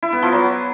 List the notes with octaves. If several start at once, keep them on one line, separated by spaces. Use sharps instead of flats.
E4
B3
F3
F#3